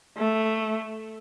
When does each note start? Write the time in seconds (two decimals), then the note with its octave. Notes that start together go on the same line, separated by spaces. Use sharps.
0.18 A3